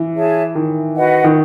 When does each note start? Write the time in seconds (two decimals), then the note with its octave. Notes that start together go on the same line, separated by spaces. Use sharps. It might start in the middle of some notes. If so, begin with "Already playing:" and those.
Already playing: E3
0.14 G#4 C#5 E5 A5
0.55 D#3
0.96 F#4 B4 D#5 F#5
1.24 D#3